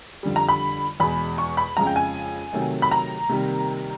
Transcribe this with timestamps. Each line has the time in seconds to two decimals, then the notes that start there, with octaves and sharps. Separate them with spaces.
0.23 F2 D3 G3
0.36 A#5
0.49 B5
1.00 E2 B2 G#3 B5
1.38 C#6
1.57 B5
1.77 F2 C#3 F3 G#3 A#5
1.87 G5
1.96 G#5
2.53 C3 D#3 F#3 A3
2.82 B5
2.91 A#5
3.29 C3 D#3 G3 A#3